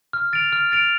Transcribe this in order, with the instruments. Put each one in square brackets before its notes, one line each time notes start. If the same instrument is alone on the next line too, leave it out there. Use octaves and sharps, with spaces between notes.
[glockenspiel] F6
A6 D7 F7
F6
A6 D7 F7